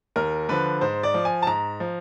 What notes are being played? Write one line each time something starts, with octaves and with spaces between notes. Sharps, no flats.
D#2 A#4
D3 F3 B4
G#2 C5
D5
F3
G#5
A5
G#2 A#5
F3